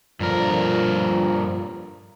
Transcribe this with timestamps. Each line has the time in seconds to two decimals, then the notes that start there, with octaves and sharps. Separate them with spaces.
0.20 G2 A#2 D3 F3 A#4